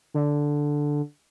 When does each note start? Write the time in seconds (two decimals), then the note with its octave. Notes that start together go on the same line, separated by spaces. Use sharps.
0.14 D3